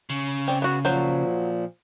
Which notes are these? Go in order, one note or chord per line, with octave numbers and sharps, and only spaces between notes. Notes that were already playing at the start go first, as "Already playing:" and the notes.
C#3
C4 D5
B3 F#4
A#2 F3 F#3 C5